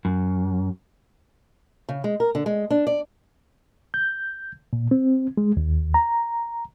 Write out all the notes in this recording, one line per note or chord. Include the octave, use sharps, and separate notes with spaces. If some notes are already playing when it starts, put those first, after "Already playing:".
F#2
C#3
G#3
A#4
D3
G#3
D4
D5
G6
A#2
C4
G#3
D#2
A#5